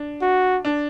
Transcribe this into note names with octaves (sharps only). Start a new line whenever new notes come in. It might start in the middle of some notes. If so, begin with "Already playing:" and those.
Already playing: D4
F#4
D4